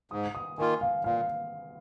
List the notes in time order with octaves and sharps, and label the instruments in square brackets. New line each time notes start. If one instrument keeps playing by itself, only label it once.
[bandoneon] G#2 [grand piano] D#6
[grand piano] D#6
[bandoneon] D#3 A#3 F4 [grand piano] G#5
[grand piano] F5
[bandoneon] A#2 [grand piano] F5